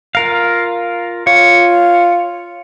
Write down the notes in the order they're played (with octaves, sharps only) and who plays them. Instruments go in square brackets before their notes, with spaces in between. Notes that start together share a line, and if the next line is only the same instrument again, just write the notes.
[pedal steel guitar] F4 A#4 F5
[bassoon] F4 [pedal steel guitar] C#5